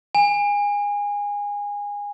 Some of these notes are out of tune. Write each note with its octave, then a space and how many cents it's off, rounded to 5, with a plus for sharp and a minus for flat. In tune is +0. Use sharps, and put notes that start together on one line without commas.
G#5 -20